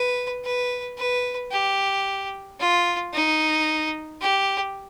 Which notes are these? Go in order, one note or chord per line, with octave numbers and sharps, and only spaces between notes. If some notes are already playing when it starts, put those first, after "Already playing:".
Already playing: B4
B4
B4
G4
F4
D#4
G4